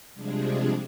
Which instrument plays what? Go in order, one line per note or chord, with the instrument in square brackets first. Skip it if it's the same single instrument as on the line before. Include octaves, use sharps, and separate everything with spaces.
[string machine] C3 F3 G3 G#3 D4 G#4